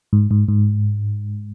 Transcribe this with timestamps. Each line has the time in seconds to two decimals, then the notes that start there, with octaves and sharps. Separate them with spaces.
0.13 G#2
0.31 G#2
0.48 G#2